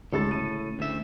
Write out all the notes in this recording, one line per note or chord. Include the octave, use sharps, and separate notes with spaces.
D2 A2 G#3 A4 A6
C#3 D#7
D2 E5